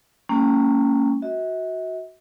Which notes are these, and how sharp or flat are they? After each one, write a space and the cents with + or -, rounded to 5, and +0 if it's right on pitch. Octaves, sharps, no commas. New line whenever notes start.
G3 +40 A#3 -30 C#4 +0
F#4 +0 E5 -45